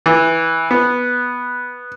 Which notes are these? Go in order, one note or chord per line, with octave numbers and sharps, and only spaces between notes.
E3
B3